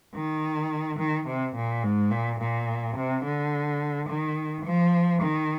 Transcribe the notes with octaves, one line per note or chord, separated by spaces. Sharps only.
D#3
D#3
C3
A#2
G#2
A#2
A#2
C3
D3
D#3
F3
D#3